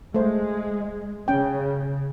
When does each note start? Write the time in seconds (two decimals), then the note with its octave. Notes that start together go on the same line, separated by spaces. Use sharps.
0.14 G#3 A3 C5
1.28 C#3 C#4 G5